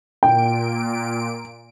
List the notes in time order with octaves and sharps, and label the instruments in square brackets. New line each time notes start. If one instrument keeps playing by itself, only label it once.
[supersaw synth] A#2 D7 [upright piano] G5